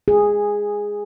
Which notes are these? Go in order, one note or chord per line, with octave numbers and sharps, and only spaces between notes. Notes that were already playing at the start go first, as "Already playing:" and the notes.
G#4